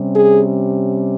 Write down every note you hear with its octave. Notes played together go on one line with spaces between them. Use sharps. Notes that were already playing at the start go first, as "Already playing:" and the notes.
Already playing: C3 G3 C#4
G#4